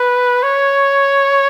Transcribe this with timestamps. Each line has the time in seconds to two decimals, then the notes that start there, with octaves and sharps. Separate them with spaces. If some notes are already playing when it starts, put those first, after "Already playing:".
Already playing: B4
0.43 C#5